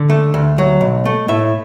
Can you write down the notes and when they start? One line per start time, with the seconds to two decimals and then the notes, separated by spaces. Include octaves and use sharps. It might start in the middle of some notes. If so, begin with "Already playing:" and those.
Already playing: D3
0.10 A3
0.34 D2
0.58 F#3
0.81 B1
1.05 A3
1.28 A2 E5